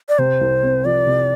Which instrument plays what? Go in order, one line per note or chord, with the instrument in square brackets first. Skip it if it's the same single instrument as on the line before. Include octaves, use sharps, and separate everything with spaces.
[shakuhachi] D5
[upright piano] C3 [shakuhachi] C5
[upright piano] C2
C4
[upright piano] F3 [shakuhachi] D5
[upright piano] C3